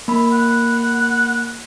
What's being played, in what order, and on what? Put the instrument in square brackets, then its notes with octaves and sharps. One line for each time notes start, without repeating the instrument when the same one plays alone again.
[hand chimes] A#3 B5
[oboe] F#5